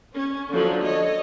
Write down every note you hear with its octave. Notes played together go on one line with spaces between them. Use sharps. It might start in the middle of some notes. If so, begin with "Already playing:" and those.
C#4
D3 F3 F#3 A4
A4 C#5 D#5